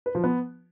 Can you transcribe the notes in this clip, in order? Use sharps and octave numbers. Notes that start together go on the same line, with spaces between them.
B4
F3
B3